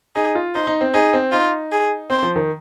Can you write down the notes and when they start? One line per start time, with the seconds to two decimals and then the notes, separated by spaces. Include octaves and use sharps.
0.16 D#4 G#4
0.35 F4
0.55 D#4 C5
0.67 D#4
0.81 C4
0.94 D#4 G#4
1.13 C4
1.32 D#4 F4
1.72 G#4
2.10 C4 C5
2.23 F3
2.36 D#3